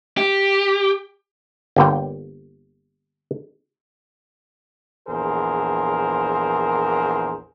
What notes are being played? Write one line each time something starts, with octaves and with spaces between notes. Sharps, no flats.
G4
G1 D3 A#3 G5
A#1 E2 G#4 A#4 C5